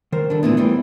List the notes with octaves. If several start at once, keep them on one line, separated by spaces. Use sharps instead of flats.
D#3 A#4 C5
D3 G3 D4
D2 A#2 E3 B3
E3 G3 C4